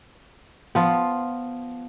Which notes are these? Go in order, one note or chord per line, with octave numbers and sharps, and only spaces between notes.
F3 B3 F4